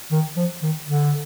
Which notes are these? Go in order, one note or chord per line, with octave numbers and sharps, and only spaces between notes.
D#3
F3
D#3
D3